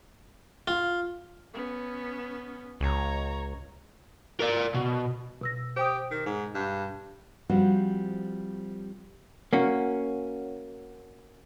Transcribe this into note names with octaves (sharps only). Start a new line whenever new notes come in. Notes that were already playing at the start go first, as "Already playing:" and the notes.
F4
B3 C#4
C#2 C#5 A#5
A#4 D5
B2
B2 E6 A#6
G4 C5 G5 D#6
D#3
G#2
G2
F3 G3 C4 F4 F#4 C5
A#3 C#4 F#4